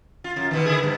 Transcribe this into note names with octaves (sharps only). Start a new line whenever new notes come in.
F4
F#2 F4
B2 D#3
D3 E4 G#4
G2 B2